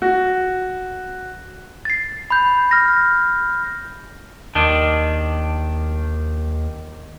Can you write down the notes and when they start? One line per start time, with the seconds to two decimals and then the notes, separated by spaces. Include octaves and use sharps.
0.02 F#4
1.85 A6 C7
2.30 B5 G6
2.71 F6 A#6
4.55 D#2 D#3 D4